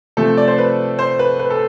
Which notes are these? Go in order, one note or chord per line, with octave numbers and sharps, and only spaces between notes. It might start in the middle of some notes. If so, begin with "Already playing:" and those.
C3 F3 A3 C4 A4
D5
C5
B4
C5
B4
B4
A4